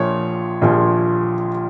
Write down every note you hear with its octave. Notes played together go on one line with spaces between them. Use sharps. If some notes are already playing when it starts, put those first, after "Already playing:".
Already playing: A#1 A#2 F3 C#5
A#1 A#2 F3